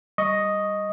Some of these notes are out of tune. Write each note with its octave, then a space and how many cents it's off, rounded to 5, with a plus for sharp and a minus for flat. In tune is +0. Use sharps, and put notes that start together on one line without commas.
G3 +0 D#5 +0 C#6 +0